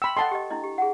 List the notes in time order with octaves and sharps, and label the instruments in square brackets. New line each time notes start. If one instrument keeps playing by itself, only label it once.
[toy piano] G5 C6 [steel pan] B5 E6
[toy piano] A4 D#5 G5 [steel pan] F#5 A5 C6
[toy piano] G4 D#5
D4 E4 D#5
G4
G#4 F#5